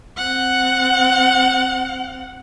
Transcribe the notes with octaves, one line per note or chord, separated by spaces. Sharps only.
C4 F#5